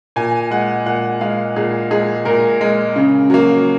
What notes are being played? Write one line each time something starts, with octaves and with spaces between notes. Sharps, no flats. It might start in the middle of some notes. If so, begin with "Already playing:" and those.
A#2 G#5
G#3 F#5
A#2 F#5
G#3 F5
A#2 G#4
G#3 G#4
A#2 A#4
G#3
C#3
F#3 A#3